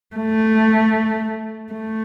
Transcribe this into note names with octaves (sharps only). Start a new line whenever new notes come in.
A3
A3